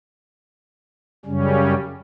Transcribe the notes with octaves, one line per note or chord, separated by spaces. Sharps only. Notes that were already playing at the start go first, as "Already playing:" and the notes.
F#2 C#3 G3 C#4